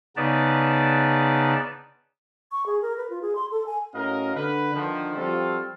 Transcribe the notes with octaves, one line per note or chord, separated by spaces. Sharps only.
C#3 B3 D#4 B4 D5 A5
C#6
G#4
A#4
B4
F4
G#4
C6
A4
G#5
A2 C#4 F#4 A#4 D#5 F5
D3 B4
D3 D#3 F3
F3 G3 C4 F4 F#4 A4